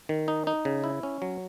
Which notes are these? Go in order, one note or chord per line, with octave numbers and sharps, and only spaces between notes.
D#3
D#4
D#4
C#3
E4
C#4
F#3